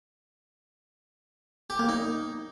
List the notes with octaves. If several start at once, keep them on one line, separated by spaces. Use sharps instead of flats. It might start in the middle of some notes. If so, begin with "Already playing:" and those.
G4
A#3
D#4